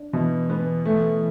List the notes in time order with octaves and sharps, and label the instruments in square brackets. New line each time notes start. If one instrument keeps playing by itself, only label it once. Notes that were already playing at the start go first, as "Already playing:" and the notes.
Already playing: [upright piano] D4
[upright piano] B2 [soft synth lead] E3
[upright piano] B3
A3